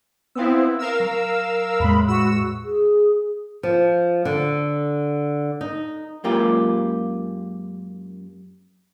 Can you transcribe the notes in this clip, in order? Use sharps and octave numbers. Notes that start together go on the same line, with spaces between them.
B3 C4 E4 F5 D#6 E6
A#4 F5 E6
F#3
E2 A2 G#3 B5
F#4 E6
G#4
F3
D3
D#4
F#2 G#3 A#3 F4 G4 A#5